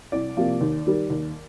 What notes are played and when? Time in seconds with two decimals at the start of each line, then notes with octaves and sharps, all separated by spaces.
0.12 C2 D5
0.37 C3 F3 A#3
0.61 D#2
0.87 D#3 G3
1.10 D#2